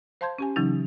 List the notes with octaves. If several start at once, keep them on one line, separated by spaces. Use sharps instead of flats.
C5 F5 A5 C6 G6 G#6
C#4 G4 G#5
C#3 E3 F#3 C#4 D#4